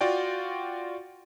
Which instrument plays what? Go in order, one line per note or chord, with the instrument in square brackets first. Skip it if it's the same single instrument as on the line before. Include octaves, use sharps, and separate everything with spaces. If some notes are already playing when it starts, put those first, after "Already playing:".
[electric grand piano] F4 F#4 D5 G5